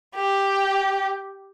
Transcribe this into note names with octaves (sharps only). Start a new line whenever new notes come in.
G4